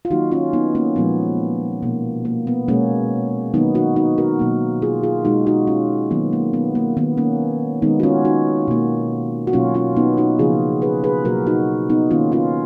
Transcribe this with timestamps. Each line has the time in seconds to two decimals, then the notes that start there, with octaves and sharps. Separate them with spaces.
0.05 F4
0.10 D#3 F#3 A#3 D#4 F#4
0.32 C#4 F4
0.53 B3 D#4
0.75 A#3 C#4
0.96 A#2 F3 G#3 B3
1.82 B2 A#3
2.25 A#3
2.47 B3
2.68 B2 G#3 A#3 C#4
3.54 D#3 F#3 A#3 B3 D#4
3.75 D#4 F#4
3.96 D#4 F#4
4.18 F#4 A#4
4.39 B2 F#3 A#3
4.82 F4 G#4
5.03 F4 G#4
5.25 B2 G#3 D#4 F#4
5.47 D#4 F#4
5.67 C#4 F4
6.11 D#3 F#3 A#3 B3
6.33 A#3
6.53 B3
6.75 A#3
6.97 D#3 A#3 B3
7.17 A#3 C#4
7.82 D#3 G#3 B3 D#4
8.00 F#4
8.03 C#4 F4
8.25 D#4 F#4
8.68 B2 A#3
9.47 F#4
9.53 B2 F#3 A#3 C#4 F4
9.74 C#4 F4
9.96 B3 D#4
10.17 D#4 F#4
10.39 C#3 F3 A#3 F4 G#4
10.82 G#4 B4
11.04 G#4 B4
11.25 B2 F#3 A#3 F#4 A#4
11.47 D#4 F#4
11.90 B3 D#4
12.10 D#3 A#3 C#4 F4
12.32 C#4 F4